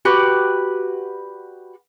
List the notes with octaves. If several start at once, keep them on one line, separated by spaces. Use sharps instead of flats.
F#4 G4 B4 D5